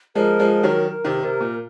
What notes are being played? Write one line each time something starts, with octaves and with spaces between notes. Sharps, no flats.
F3 G#3 A#4
F3 G#3
A#4
D#3 F#3
A#4
C3 D#3
C3 A#4
A#2